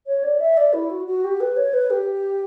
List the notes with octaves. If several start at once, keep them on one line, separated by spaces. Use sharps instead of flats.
C#5
D5
E5
D5
E4
F#4
F#4
G4
B4
C#5
B4
G4